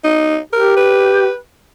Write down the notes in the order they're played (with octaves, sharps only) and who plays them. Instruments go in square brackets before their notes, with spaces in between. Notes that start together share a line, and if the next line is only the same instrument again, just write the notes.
[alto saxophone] D#4
[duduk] G4 [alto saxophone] A#4
[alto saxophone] B4